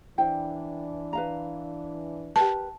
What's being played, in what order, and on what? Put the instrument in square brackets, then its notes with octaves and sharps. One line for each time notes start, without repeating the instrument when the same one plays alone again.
[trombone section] E3 D4 [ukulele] E4 C5 G5
[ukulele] B4 F5 A#5
[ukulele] G4 A#4 B4 [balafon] A5